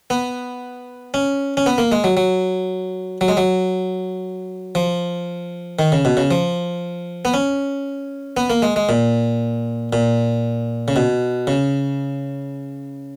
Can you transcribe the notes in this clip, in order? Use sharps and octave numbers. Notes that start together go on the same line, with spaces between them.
B3
C#4
C#4
B3
A#3
G#3
F#3
F#3
F#3
G#3
F#3
F3
D#3
C#3
B2
C#3
F3
B3
C#4
B3
A#3
G#3
G#3
A#2
A#2
C#3
B2
C#3